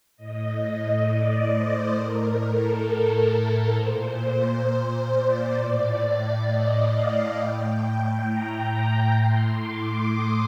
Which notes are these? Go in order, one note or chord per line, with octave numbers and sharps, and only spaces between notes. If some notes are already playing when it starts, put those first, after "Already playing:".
A2 D#5
D5
C5
A2 A#4
A4
A#4
A#2 C5
C5
D5
A2
D5
D#5
F5
A2 G5
A#5
A2 C6
D6
D#6